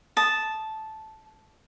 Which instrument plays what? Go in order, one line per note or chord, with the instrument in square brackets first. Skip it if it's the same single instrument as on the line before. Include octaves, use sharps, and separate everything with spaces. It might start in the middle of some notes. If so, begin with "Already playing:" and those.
[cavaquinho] A5 D#6